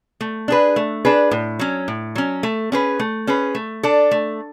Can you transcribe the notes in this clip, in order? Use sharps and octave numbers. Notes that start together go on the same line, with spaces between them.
A3
D4 G#4 B4
A3
D4 G#4 B4
A2
F#3 C#4
A2
F#3 C#4
A3
C#4 G#4 B4
A3
C#4 G#4 B4
A3
D4 A4
A3